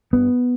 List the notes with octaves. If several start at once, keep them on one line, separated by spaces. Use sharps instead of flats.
G2 B3